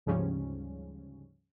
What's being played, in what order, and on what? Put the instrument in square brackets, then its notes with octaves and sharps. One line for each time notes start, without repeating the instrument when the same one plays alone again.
[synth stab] D2 G#2 C#3 F3 G3 C#4